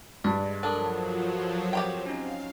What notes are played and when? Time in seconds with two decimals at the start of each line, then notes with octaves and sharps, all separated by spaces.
0.24 G2 G#3 D5
0.63 F3 F#3 D4 A4 A#4 D#6
1.73 C4 G4 C#5 G5
2.06 C#4 D#4 F5